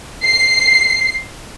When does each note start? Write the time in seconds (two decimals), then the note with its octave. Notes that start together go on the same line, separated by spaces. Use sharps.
0.24 C7